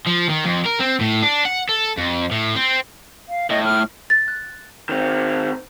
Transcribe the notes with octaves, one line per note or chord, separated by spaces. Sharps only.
F3
D#3
F2
A#4
C4
A2
D4
F#5
A4
F2
A2
C4
F5
A2 D#5
F6
A6
F#6
D#3 C4